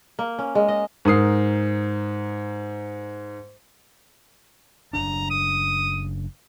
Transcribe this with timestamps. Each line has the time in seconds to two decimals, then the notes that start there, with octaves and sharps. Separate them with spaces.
0.19 A#3
0.39 C#4
0.55 G#3
0.68 D#5
1.05 G#2 A#4 D#6 C7
4.93 F#1 C#3 D4 A#5
5.30 D#6